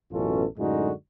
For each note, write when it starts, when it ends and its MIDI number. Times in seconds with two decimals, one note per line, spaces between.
0.11 0.44 33
0.11 0.44 42
0.11 0.44 47
0.11 0.44 61
0.11 0.44 65
0.11 0.44 69
0.57 0.90 42
0.57 0.90 45
0.57 0.90 50
0.57 0.90 56
0.57 0.90 63
0.57 0.90 66